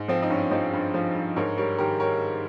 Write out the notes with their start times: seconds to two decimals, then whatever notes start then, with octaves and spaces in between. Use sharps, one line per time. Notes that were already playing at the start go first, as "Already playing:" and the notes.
Already playing: G#2
0.08 F3 C4
0.23 D#4
0.30 G2 C#4
0.51 F3 C4 D#4
0.73 G2
0.94 F3
1.15 G2
1.36 G#2 A#4 C#5
1.57 G3 A#4 C#5
1.78 D#3 G4 A#4
2.00 A#4 C#5